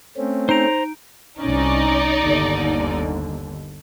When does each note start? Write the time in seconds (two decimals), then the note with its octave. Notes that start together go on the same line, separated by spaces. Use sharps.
0.17 A3 C4 C#4
0.49 D#4 C5 A#5 D7
1.41 C2 C#4 D#4 D5
2.19 G1 D#2 D3